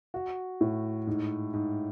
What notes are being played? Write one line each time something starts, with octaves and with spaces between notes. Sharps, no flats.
F#4
A2
G#2
G#2